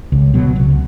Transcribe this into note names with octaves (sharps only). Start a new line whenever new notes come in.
C#2
B2 F#3
C#2